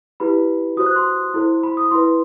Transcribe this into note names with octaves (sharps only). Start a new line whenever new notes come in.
E4 G4 B4 B5
F#4 C5 D#6
F#6
C6
E4 A4 C5
B5
D#6
E4 B4 C6